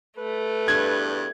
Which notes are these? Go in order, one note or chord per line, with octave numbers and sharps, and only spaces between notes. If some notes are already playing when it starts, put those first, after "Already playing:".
A3 B4
E2 G2 G#6